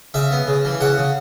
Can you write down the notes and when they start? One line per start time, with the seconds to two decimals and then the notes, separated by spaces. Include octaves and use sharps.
0.14 C#3 E5
0.31 B3
0.48 C#3
0.65 E3
0.81 C#3 F#5
0.98 C#3